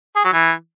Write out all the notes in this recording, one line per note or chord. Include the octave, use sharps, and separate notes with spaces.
G#4
F#3
E3